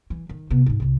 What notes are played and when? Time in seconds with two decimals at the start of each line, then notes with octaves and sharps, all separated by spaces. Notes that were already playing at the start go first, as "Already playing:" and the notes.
0.10 E3
0.29 D#3
0.50 C3 B3
0.66 G#2 D4
0.80 C2 C3